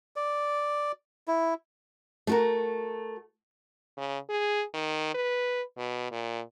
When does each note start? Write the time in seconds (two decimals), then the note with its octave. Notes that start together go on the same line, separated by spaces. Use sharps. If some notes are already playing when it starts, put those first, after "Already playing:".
0.16 D5
1.28 E4
2.27 A3 F#4 A#4
3.97 C#3
4.29 G#4
4.74 D#3
5.14 B4
5.77 B2
6.11 A#2